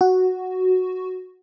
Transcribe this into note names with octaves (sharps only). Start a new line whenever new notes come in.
F#4